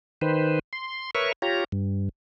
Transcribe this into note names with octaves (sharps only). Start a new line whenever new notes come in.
D#3 B4 C5
C6
A#4 B4 C#5 E5 C#6
F4 G4 C#5 A#5
G2